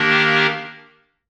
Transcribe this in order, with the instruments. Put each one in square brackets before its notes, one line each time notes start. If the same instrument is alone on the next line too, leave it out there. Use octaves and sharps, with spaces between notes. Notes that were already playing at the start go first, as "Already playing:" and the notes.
Already playing: [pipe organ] D#3 A#3 D4 G4 A#4